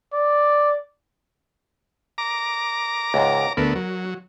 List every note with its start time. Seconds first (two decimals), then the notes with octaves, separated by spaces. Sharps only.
0.13 D5
2.18 A#5 D6
3.14 C#2 G#2
3.57 D2 A3 B3 A#4
3.75 F#3